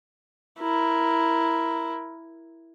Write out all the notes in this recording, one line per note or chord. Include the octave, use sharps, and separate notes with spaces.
E4 A#4